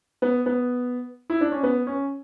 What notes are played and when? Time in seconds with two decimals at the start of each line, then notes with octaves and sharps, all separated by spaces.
0.22 B3
0.46 B3
1.30 E4
1.41 D4
1.52 C#4
1.63 B3
1.87 C#4